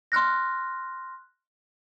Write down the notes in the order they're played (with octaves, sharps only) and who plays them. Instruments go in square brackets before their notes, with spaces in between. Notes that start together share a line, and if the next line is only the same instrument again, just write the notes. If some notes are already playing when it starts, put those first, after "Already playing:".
[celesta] C6 F6 F#6 A#6